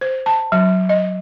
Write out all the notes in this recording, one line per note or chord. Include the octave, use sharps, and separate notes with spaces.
C5
A5
F#3
D#5